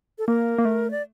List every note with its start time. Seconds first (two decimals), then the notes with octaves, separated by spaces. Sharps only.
0.18 A4
0.27 A#3 A#4
0.58 A#3
0.65 A3
0.91 D5